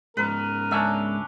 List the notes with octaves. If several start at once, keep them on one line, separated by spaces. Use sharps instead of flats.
G#2 C#3 A#4 B4
C#2 C#4 D4 E5